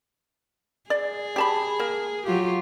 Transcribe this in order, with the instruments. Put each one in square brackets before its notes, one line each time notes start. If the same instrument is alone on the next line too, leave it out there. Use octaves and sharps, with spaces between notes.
[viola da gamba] G#4 [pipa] D5
[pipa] G4 A5 B5
A#3
[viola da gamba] F#3 F4 G4